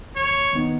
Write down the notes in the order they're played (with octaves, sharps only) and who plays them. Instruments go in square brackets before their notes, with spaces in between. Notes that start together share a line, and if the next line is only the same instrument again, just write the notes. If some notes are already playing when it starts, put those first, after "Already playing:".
[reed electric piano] D#2 [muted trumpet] C#5
[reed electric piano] D#3 B3 D#4